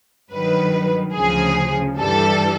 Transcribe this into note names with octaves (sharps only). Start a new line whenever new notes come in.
G2 D#3 F#3 B4
D2 C#3 F3 G#4
G2 E3 G3 A4